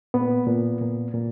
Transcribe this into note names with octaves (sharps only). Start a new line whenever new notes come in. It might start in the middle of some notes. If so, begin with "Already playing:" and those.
A#2 B3
A#2
A#2
A#2